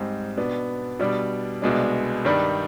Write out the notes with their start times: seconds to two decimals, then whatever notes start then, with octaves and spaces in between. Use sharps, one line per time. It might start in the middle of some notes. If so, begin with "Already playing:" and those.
Already playing: G#2 G3 C4 D#4
0.37 B2 B3 D4
0.99 B2 G3 D4
1.62 C2 B2 G#3 D4
2.25 G2 D#3 G3 D4